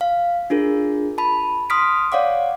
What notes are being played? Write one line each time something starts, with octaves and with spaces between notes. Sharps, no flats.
F5
D4 F4 G#4 A#4
A5 B5
C6 D#6 F6 B6 D7
C#5 D5 F5 F#5 D6